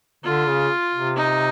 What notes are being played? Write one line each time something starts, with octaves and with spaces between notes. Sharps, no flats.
D3 F4
C#3
C3
D#4